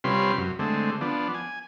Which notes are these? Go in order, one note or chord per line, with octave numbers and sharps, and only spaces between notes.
C3 G3 C#4 F4 B4 C6
F#2
D3 G#3 A3 C4
F3 B3 D4
G#5